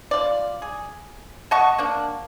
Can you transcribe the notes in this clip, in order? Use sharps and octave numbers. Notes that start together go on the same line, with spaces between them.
F4 D5
G#4
D#5 F#5 A5 C#6
A#3 D4